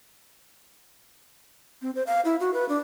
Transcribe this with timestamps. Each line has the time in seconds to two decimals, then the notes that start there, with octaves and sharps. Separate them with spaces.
1.82 C4
1.95 C5
2.07 F5
2.25 E4
2.40 F#4
2.54 B4
2.69 D4